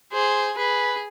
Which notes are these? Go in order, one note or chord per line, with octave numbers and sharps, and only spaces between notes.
G#4 C5
G#4 B4